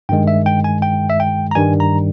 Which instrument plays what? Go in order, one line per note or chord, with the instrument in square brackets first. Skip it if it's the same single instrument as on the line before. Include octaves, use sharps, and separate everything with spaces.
[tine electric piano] G2 D#3 G#3 G5
E5
G5
G#5
G5
E5
G5
A#5
G2 D#3 G3 G#5
A#5